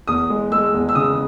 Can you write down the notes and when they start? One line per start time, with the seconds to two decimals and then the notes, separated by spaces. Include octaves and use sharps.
0.07 E2 D#6
0.30 G#3
0.52 G#3 E6
0.74 E2
0.89 E6
0.95 C#3 D#6